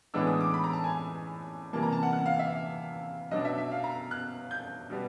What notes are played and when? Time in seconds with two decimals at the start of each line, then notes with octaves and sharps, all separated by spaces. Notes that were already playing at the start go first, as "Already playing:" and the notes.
0.14 A2 E3 G#3 B3 D4 E6
0.27 D#6
0.41 D6
0.54 B5
0.64 A#5
0.73 A5
0.84 G#5
1.73 C3 E3 G3 A#3 A5
1.83 A#5
1.92 A5
2.03 F#5
2.13 F#5
2.26 F5
2.39 E5
3.31 B2 F#3 B3 D4 D#5
3.45 E5
3.58 E5
3.72 F5
3.84 A#5
4.11 F#6
4.51 G6
4.90 B2 G3 B3